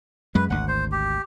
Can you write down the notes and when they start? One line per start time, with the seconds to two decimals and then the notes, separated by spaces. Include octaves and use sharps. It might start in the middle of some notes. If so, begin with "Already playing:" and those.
0.35 F#2 G#3 B4
0.50 G#1 D2 F#5
0.68 C5
0.92 G4